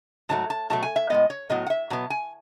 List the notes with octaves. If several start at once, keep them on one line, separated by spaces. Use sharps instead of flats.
G#2 F#3 A3 A5
A5
B2 F#3 A3 A5
G#5
E5
A2 G#3 B3 D#5
C#5
A2 F#3 B3 D#5
F#5
E5
B2 F#3 B3 A5
G#5